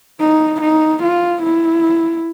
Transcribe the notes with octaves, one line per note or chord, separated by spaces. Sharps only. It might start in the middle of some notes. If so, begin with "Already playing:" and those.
D#4
D#4
F4
E4